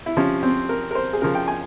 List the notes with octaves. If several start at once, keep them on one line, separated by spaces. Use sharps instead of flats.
E4
C3 F3 C#4
C4
A#4
A#4
C5
G#4
C#3 F3 A#4
G5
G#5